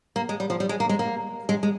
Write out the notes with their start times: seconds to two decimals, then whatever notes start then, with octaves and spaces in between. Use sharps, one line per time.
0.16 A#3
0.29 G#3
0.40 G3
0.50 F3
0.60 G3
0.69 G#3
0.80 A#3
0.89 G#3
0.99 A#3
1.49 G#3
1.63 G#3